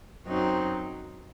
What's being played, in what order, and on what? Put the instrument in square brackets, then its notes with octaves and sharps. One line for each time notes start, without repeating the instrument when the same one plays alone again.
[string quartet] F#2 F#3 C4 D#4